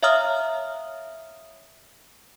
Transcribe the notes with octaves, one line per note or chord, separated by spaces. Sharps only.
C#5 E5 F5 A#5 D#6 F6